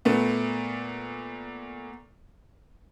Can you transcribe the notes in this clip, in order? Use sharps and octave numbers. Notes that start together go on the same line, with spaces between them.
A#2 A3 B3